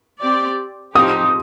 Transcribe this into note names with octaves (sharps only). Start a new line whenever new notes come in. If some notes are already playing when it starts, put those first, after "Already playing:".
C4 G4 D5
F3 C4 D#4 G4 D#6